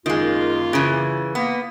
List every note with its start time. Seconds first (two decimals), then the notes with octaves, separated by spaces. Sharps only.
0.06 F#2 D#3 G#3 A#3 F4
0.73 C#3 E3
1.35 A#3 B3